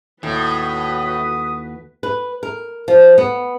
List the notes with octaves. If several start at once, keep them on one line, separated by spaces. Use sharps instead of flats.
D#2 A2 F#4 B4 D#6
B4
A#4
F3
B3